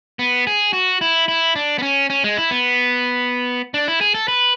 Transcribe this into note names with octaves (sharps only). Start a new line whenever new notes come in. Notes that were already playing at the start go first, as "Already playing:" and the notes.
B3
G#4
F#4
E4
E4
D4
B3
C#4
C#4
G#3
E4
B3
D4
E4
G#4
A4
B4